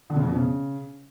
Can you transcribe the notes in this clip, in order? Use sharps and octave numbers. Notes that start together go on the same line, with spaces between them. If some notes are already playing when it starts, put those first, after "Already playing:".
D3
C#3
F2
B2
C#3